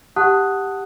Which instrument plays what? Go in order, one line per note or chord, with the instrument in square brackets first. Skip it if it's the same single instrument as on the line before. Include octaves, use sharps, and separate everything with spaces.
[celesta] G4 F#5 A5 D#6 F#6